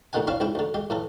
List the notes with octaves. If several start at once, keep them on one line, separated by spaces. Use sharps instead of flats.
D2 A#2 D3 D#3 F#5 G#5
C4 D4 E4 C#5 D5 F5
C#2 G#2 E4 G5
D2 D3
G#3 G4
A2 E3 A4